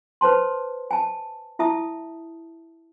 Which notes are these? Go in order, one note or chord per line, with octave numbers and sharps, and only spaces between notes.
B4 C5 A5 C6
G#5 A5
E4 E5 A5 D#6